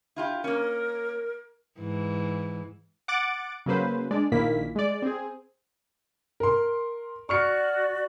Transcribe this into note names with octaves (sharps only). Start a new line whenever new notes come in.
E4 F4 G4
A#3 C#4 A#4
G#2 E3
F#5 D6 A6 D7
C#3 F#3 A#3 B4 C5
G#3 D4 D5
A#1 A#2 D#3 A#3 E4 B6
G#3 D5
C4 G#4
A#4 C6
F#4 D5 C#6 F6 C#7